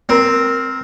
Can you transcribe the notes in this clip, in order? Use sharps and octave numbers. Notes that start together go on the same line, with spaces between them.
C4 A#4